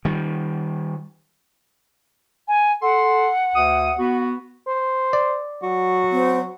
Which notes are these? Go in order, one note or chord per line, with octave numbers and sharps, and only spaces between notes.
D#3 G3
G#5
A4 F#5 C6
D2 D#6
B3 F#4
C5
D5
F#3 F#4
C4